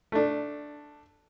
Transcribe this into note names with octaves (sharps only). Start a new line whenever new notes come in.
A3 D4